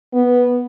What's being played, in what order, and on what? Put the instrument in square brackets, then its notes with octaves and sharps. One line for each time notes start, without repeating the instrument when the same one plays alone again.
[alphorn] B3